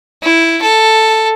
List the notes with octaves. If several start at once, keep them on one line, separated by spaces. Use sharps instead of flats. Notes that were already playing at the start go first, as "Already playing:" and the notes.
E4
A4